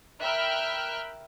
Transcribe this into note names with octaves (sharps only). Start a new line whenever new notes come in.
A#4 E5 G5 B5 F6 F#6